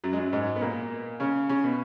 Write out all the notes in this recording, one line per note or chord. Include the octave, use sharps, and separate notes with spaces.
F#2 F#3
G#3
F#2 F#3
G#2 G#3
B3
A#2 A#3
C#3 C#4
C#3 C#4
B2 B3